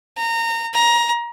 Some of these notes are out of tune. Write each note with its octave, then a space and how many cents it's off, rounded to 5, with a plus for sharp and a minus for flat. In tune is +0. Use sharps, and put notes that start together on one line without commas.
A#5 -25
A#5 +20